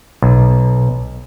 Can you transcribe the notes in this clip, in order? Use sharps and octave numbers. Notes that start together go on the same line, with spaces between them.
B1